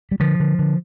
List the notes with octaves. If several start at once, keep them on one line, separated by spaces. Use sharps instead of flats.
G3
D3 F3
D3
D3